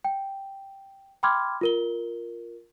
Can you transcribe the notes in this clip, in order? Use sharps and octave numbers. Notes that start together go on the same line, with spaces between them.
G5
G5 B5 C6 D6 F6 G#6
F4 A#4 G7